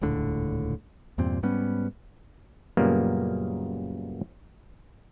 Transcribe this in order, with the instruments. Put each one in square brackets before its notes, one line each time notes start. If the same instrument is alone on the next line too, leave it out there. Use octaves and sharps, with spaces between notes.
[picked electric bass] D#1 C#2 A2 D3
E2 G2 A#2 C4
G#2 G3 B3 C#4
[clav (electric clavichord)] F#2 A#2 C#3 G3 A#3 B3